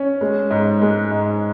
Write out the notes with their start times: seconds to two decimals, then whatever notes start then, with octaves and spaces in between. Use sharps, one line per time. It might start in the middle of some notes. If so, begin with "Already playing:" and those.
Already playing: C#4
0.21 G#3
0.51 G#2
0.82 G#3
1.11 G#2